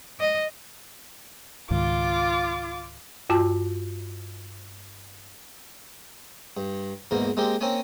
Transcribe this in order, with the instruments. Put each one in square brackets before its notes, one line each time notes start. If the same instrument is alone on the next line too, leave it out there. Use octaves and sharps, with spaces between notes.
[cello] D#5
[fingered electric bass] C#2 G#2 D#3 [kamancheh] F4 D6
[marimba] G2 F4 F#4 A5
[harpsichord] G2
E2 G#2 B2 A#3
G#3 A#3 C4 G4
A#3 C4 C#4 C#5 G#5